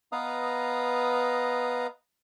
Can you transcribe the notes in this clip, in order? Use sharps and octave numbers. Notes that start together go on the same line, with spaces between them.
B3 B4 D#5 F5 A#5 D#6